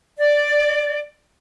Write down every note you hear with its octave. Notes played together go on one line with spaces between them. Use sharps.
D5